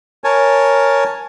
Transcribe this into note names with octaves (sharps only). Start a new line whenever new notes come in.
A#4 C#5 G#5 A5